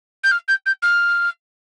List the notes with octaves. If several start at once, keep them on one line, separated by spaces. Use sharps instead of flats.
G6
F6
G6
G6
F6